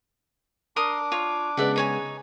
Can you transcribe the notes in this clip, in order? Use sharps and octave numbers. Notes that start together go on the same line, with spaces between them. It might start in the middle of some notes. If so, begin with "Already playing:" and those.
D4 A#4 C6 D6 D#6
F4 C#5
C#3 G#3 B3 D5 E5 F#5
D#4 C#5 G#5